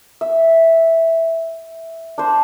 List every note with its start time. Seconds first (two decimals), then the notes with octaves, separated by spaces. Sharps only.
0.21 E5
2.18 D4 C5